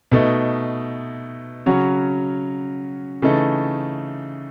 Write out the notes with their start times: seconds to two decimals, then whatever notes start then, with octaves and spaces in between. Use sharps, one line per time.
0.12 B2 A3 D#4
1.66 C#3 F#3 C#4 F#4
3.22 C#3 E3 A3 D#4 A4